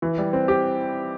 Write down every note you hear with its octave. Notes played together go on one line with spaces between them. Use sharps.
E3
G3
C4
G4